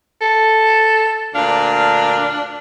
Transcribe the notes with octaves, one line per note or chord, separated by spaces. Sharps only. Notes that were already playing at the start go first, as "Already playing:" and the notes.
A4
D2 A#2 D4 F5